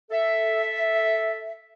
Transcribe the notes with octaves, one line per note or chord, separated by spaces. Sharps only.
A4 E5